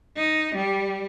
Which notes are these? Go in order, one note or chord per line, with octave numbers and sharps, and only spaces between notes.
D#4
G3